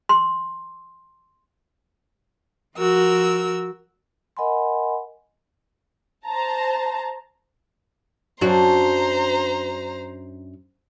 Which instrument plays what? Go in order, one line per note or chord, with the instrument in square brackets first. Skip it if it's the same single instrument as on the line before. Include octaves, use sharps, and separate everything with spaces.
[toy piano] C6
[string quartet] F3 F#4 A#4 E6
[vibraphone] A#4 D#5 F#5 G#5 B5 C6
[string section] C5 A5 A#5
[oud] F#2 D4 F#4 [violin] C5 A#5